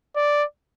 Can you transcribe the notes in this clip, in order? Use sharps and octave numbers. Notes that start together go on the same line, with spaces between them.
D5